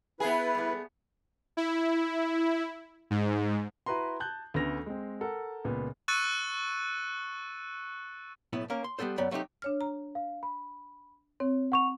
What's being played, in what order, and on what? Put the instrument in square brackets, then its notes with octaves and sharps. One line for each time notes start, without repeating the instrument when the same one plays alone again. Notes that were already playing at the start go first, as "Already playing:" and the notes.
[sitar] B3 G#4 [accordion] E4 B4 [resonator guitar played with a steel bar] E5 G#5
[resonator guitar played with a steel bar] G3 A3
[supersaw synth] E4
G#2
[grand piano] E4 F#4 B4 A#5 C6
A5 F#6 G6
D2 A3 B3 C#4 A#6 F7
G#3 C4
A4 A#4 F#5
C#2 A#2 B3
[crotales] C#6 E6 F#6 A6 C#7 D#7
[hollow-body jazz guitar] B1 A2 B3 E4
A#3 C#4 A#4
C6
G3 A3 B3 A4 C5
F#2 F#3 B3 D5 G5
F#3 A3 C4 D#4 G4
[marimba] D4 C#5 F6
A#5
[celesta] F5
B5
[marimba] C4 [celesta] C#5
[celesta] F#5 C#6 F7